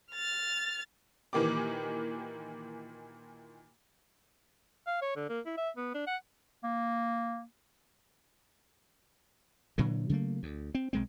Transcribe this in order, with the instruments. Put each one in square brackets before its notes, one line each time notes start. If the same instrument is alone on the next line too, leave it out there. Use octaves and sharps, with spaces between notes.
[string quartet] F6 A6
[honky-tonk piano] A#2 D#3 E3 A#3 G4 D6
[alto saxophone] F5
C#5
D3
A#3
E4
E5
B3
D4
F#5
[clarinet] A#3
[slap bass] A#2 D3 E3 F#3
C#3 F#3 A3 A#3
D2
C4
B1 G#3 C4